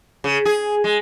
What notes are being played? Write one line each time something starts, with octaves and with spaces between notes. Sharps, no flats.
C#3
G#4
G#3